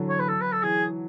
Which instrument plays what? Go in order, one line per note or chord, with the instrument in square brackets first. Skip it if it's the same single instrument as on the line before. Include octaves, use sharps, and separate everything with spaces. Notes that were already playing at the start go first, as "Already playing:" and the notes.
Already playing: [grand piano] D3 E3 F#3
[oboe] C#5
B4
A4
B4
A4
[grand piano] E3 [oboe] G#4